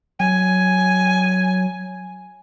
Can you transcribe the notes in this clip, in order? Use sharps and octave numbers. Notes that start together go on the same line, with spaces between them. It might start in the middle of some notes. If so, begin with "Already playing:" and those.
F#3 G#5